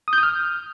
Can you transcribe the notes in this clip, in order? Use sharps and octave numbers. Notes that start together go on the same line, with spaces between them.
D#6
G6
D#6
F6